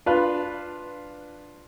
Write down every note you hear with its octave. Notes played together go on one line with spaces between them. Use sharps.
D4 F4 B4